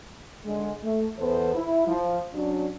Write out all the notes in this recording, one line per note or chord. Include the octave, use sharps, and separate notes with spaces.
D3 G#3
A3
E2 E3 B3 A4 C5
E4
F3
F#3 C#4 D4